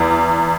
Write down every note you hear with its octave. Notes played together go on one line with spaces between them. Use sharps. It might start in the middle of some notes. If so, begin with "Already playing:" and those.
Already playing: E2